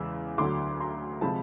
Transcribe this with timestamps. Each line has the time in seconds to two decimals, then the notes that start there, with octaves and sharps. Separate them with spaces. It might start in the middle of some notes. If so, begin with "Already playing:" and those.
Already playing: E2 C#3 E3 G#3 E6
0.38 D2 D3 F#3 C6 D6
0.80 A#5 C6
1.21 C3 F3 G#3 A5 B5